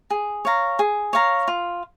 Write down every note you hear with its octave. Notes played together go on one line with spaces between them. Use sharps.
G#4
C#5 F5 A#5
G#4
C#5 F5 A#5
F4